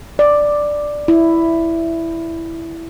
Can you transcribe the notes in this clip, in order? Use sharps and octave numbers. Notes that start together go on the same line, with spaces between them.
D5
E4